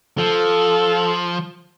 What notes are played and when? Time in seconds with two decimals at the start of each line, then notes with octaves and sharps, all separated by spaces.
0.18 F3 A4